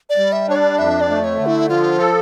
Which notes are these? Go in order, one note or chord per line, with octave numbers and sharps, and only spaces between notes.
D5
G3
E5
D4 C#5
D5
F2 E5
D5
A3
C#5
D3
E4
F3 F4
A4